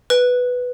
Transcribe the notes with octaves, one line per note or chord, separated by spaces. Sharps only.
B4